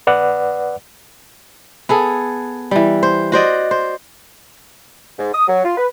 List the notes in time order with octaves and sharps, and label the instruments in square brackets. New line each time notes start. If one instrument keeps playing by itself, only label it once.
[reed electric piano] B4 D5 F#5
[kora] B3 G#4 A4
E3 G3
C5
F#4 C5 D5 D#5
C5
[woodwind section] G#2
D#6
F#3
F4
B4